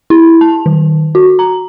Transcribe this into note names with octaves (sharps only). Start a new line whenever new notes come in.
E4
A5
D#3
F#4
A#5